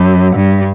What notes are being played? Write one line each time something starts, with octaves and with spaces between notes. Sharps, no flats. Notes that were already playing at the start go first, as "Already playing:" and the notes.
Already playing: F#2
G2